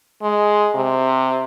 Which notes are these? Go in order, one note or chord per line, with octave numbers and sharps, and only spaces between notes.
G#3
C3